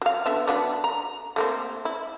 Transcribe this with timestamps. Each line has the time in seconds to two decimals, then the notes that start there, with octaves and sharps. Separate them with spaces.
0.01 F#3 F5
0.26 D3 B3 E5
0.47 F#3 B3 D4
0.84 A#5
1.36 A3 A#3 C4
1.85 E4